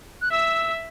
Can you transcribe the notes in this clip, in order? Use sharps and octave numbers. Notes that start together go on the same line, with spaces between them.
F#6
E5 E6